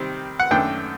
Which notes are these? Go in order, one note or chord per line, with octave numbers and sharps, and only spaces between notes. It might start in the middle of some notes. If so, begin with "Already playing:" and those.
Already playing: C3 D#3 G3 C4
F#5
F#2 D#3 A3 D4 G5